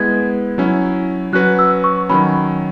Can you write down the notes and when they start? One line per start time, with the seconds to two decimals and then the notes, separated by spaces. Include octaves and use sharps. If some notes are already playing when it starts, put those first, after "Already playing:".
Already playing: G#3 B3 E4 B4 G#6
0.58 F#3 C#4 E4
1.33 F#3 C#4 F#4 B4 F#6
1.59 E6
1.84 C#6
2.09 D#3 F#3 C#4 B5